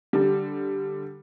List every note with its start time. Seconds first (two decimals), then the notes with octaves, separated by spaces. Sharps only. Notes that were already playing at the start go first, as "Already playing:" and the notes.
0.13 D3 G3